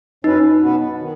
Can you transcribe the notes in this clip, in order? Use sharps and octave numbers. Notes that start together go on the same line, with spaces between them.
F#2 F#3 C#4 D#4 B4
B2 B3 F#4 B4
D#3